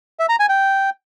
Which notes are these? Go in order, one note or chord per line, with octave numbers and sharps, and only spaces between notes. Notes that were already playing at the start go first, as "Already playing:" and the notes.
E5
A#5
G#5
G5